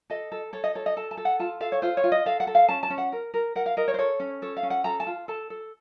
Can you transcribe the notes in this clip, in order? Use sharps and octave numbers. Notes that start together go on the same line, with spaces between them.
A4 D#5
A4
A4 C#5
D#5
A4 C#5
D#5
A4 A5
A5
A4
F#5
F4 A5
A4 F5
C#5
F4 C5
C#5
F4
D#5
A4 F5
F#5
A4
F5
C#4 A5
A5
C#4
F#5
A#4
A#4
A#4 F#5
F5
A#4 D#5
C#5
C5
A4 C#5
C#4
A4 C#5
F5
C#4
F#5
A4 A#5
A5
F4
A4 A5
A4